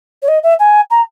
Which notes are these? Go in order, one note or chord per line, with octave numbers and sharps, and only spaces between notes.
C#5
D#5
E5
G#5
A#5